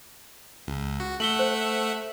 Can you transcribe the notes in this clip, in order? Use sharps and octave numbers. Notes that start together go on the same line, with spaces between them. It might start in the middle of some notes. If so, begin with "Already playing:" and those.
C#2
F#4
A3 E5 F#5 F#7 G7
C5